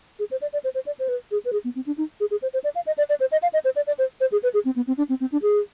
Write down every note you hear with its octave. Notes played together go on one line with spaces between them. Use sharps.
G#4
C5
D5
D5
C5
C5
D5
C5
B4
G#4
B4
G#4
B3
C4
D4
D#4
G#4
G#4
C5
C5
D5
F5
D#5
D5
D5
C5
D#5
F5
D#5
C5
D5
D5
C5
C5
G#4
B4
G#4
C4
B3
C4
D4
C4
C4
D4
G#4